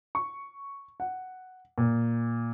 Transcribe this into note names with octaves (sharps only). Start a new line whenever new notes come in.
C#6
F#5
A#2